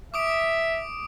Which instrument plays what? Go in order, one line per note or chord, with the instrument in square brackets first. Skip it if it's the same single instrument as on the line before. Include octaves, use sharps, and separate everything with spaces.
[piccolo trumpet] E5 [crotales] D6 D#6 D7